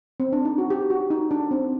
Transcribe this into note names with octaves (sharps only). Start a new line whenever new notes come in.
C4
D4
D#4
F#4
G4
F#4
D#4
D4
C4